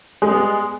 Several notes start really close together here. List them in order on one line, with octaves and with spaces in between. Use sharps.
G#3 G3 B3